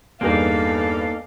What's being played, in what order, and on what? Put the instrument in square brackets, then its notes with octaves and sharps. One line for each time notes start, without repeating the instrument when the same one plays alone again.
[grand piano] E2 G2 G#4 [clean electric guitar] A#3 D#4 [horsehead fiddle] A4 F5